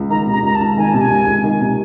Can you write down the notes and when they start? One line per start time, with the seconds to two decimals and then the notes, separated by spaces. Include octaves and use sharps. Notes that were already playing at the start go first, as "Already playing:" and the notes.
Already playing: C#2
0.10 D#3 A#5
0.26 C3
0.32 A#5
0.43 C#2 A#5
0.54 A5
0.60 C#2
0.77 D#3 G#5
0.89 A5
0.94 C3
1.00 G#5
1.10 C#2
1.27 C#2
1.44 D#3
1.61 C3